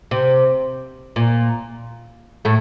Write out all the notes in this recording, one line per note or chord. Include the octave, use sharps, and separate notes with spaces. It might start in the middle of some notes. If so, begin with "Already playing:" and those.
C3
A#2
A2 A3